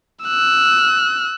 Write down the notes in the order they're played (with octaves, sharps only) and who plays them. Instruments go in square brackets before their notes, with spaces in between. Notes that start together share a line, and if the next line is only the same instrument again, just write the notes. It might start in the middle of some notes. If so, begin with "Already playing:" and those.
[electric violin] E6 F#6